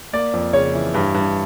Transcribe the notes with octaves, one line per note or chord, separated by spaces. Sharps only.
A#3 D5
F2
C#3 C#5
E3
G2
G2